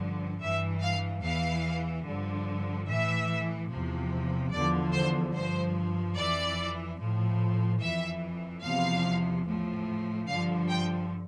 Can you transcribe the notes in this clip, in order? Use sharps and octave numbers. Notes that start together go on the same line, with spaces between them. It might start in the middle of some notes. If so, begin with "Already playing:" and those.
Already playing: G2 D3 F3
G2 E3 E5
F5
E2 E3 F5
G2 D3 F3
A2 E3 E5
E2 C3 F3
E2 D3 F3 D5
C5
G2 F3 C5
F2 E3 D5
A2 F3
F2 E3 E5
E2 C3 F3 F5
A2 F3
G2 D3 F3 F5
G5